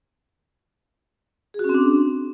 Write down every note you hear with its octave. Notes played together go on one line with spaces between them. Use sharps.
G#4
F#4
C#4
C4
D4